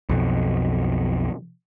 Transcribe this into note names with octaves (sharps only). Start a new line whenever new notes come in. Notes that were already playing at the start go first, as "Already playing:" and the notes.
B1 F2 B2